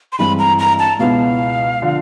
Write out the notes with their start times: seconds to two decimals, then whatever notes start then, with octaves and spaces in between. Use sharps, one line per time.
0.12 C6
0.19 G2 E3 G#3 C4 B5
0.39 A#5
0.59 A#5
0.79 A5
0.99 C#2 B2 G#3 B3 E4 F5
1.82 D3 F3